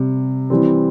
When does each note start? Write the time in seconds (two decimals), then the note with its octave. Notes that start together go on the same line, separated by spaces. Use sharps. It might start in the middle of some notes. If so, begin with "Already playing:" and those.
Already playing: C3 G3
0.50 E3 G3 C4